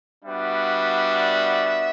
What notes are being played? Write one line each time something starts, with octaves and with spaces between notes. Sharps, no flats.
G3 B3 D4 F#4 E5